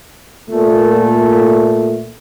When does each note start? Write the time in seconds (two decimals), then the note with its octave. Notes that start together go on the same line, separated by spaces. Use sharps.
0.51 A#2 A3